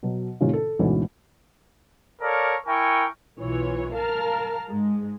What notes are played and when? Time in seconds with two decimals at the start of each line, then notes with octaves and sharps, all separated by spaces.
0.03 B2 F#3
0.41 A2 C3 D#3 C#4 F4
0.53 A4
0.79 D2 G#2 B2 E3 C#4
2.21 A4 A#4 C#5 D5 F5
2.67 E4 A#4 G5 G#5 C#6
3.39 B1 E3 F4 C#5
3.94 A#4 F5 A5 A#5 F6
4.68 G#2 G#3